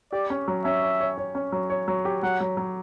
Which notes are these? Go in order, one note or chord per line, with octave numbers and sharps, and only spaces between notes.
G4 D5
C#4
F#3
C#4 E5
C#5
C#5
C#5
C#4
F#3
C#5
F#3
G4
F#3 F#5
F#3
F#3